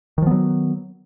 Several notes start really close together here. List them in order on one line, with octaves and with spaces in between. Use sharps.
D#3 F3 B3 F#3